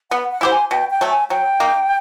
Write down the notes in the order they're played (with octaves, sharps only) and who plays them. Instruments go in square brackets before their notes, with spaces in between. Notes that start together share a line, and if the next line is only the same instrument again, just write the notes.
[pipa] B3 [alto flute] F#5
[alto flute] F#5
[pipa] E4 G4 C5
[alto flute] G#5
[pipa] B2 [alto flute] G5
[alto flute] G5
[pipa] F#3 A3
[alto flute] G#5
[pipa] F#3 [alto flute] G5
[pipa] A#3 D#4